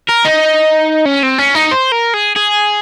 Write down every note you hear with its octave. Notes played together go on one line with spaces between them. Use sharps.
A#4
D#4
C#4
C4
C#4
D#4
C5
A#4
G#4
G#4